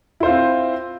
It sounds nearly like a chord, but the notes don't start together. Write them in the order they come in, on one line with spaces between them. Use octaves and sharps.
E4 C5 F4 C4